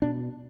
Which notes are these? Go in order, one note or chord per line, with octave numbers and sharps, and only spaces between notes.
B2 D4